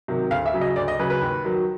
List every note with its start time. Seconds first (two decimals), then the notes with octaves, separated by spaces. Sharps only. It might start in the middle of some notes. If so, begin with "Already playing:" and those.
0.08 C3 D#3 F#3
0.30 D2 F5
0.46 E5
0.54 C#3 F#3
0.61 D#5
0.76 D2 D5
0.88 D#5
0.99 C#3 F#3 B4
1.10 B4
1.22 D#2
1.44 D#3 F#3